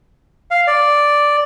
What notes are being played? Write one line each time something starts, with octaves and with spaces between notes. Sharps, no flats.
F5
D5